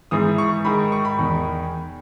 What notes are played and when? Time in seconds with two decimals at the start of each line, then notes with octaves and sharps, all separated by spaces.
0.11 G#2 E3 D#6
0.38 C#6
0.65 G#2 D#3 B5
0.92 C#6
1.05 B5
1.19 E2 D#3